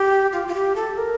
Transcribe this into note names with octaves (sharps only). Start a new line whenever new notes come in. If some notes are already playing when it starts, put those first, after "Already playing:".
Already playing: G4
F4
F4
G4
A4
A#4